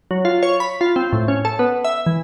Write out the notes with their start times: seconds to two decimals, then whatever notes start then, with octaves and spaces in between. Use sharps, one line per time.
0.11 F#3
0.25 F4
0.43 C#5
0.60 B5
0.81 F4
0.96 C4
1.13 A2
1.28 C#4
1.45 A4
1.59 B3
1.84 E5
2.06 E3